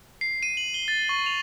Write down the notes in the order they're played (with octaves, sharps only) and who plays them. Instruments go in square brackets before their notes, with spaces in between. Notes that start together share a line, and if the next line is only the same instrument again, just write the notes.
[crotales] C7
D#7
F#7
G7
A6
C#6
F7